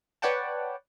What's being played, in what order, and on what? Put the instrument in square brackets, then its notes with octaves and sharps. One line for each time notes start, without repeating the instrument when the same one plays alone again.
[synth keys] B4 C#5 D5 F#5 G5 A5